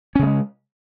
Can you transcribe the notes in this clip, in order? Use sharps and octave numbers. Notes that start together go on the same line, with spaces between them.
C#3 G#3 A3 C#4